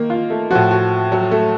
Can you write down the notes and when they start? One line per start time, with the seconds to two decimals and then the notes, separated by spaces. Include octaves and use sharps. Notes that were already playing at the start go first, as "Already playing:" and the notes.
Already playing: D#3 A#3
0.10 F4
0.30 A3
0.50 A2 F3 F#4
0.71 F#4
1.12 F#3
1.31 A3